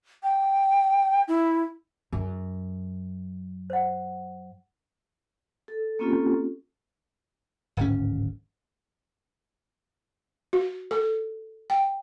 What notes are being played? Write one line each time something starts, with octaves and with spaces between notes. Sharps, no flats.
G5
E4
F#2 G#4
C5 F#5
A4
A#3 C4 C#4 F4 G4 A4
D1 G#1 C#4
F#4
A4
G5